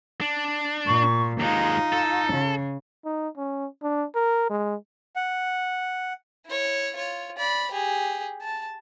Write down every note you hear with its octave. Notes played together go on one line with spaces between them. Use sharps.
D4
A#2 C#6
D#2 G#3 D#4 F4
A4
C#3
D#4
C#4
D4
A#4
G#3
F#5
E4 C#5
F4 C#5
D5 B5
G4 G#4
A5